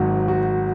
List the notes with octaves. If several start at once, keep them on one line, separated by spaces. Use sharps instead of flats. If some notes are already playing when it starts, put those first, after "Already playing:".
Already playing: G#1 G#2 F#3 F#4
F#4